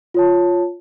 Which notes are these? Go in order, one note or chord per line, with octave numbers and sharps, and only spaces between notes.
F4 C#5 A5